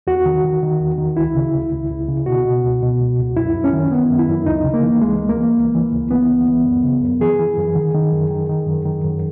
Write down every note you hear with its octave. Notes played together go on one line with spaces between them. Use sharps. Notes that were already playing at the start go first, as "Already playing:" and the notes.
E2 F#4
D#3
D#3
D#3
E2
D#3
C#2 E4
C#3
C#2
C#2
C#2
C#3
B2 F#4
B2
C#2
B2
C#2
C#2
F#2 E4
F#2
C#4
D#3
D#3 B3
F#2
E4
F#2
C#2 D#4
C#3
A#3
E3
C#2 G#3
C#2
A#3
E3
C#2
E3
C#2
E3 B3
C#2
C#2
F#2
C#3
F#2
E3 G#4
E3
F#2
D#3
D#3
F#2
D#3
D#3
F#2
D#3
F#2